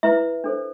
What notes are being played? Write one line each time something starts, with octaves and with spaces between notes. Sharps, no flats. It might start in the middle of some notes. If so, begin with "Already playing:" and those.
E4 B4 E5
D4 A4 C5